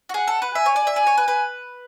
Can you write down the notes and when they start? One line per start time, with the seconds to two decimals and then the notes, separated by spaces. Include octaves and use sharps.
0.09 F#4
0.14 G#4 F#5
0.28 A4
0.42 B4
0.55 E5 G#5
0.66 C#5
0.76 D5
0.87 E5
0.96 D5 G#5
1.07 C#5
1.18 B4
1.28 B4